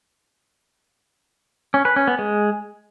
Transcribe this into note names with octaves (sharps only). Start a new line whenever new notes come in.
C#4
B4
C#4
B3
G#3